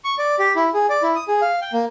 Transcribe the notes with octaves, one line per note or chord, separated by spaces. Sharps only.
C#6
D5
G4
E4
G#4
D5
E4
D#6
G#4
F5
G5
A#3